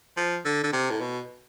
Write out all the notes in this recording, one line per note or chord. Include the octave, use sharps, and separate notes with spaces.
F3
D3
D3
C3
A2
B2